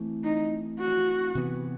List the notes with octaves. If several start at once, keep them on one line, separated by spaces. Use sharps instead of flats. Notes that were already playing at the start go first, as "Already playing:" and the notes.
Already playing: E3 A3 C4
D#4
F#4
C3 E3 B3